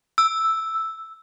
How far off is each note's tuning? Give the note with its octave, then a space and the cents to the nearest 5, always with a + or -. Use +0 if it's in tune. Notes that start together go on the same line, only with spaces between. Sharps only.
E6 -5